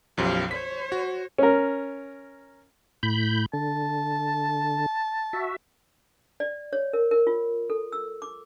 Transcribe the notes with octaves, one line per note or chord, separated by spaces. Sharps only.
B1 F#2 F3 G4 F5
C5 C#5 B6
F#4
C#4 A#4
A2 B5 G6
D3 A5
F#4 E5
D5
C#5
A#4
A#4
F4
A4
E6
D6